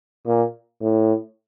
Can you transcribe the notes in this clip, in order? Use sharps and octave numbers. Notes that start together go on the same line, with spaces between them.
A#2
A2